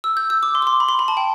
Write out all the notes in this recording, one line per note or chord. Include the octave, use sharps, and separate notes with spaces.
E6
G6
E6
D6
C6
D6
C6
B5
C6
B5
A5
G5